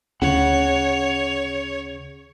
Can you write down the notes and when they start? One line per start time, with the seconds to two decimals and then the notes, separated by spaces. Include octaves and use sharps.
0.22 D2 C#3 C#5 F#5